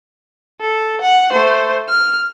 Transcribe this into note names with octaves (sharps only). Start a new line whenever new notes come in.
A4
F#5
A3 C5
F6